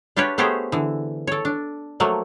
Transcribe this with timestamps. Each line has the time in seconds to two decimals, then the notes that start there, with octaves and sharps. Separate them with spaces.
0.16 D4 F4 G4 B4 C#5
0.38 A3 B3 G4 G#4 C5 C#5
0.72 D3 E3
1.27 A4 C#5
1.45 D4
2.00 F3 F#3 A3 A#3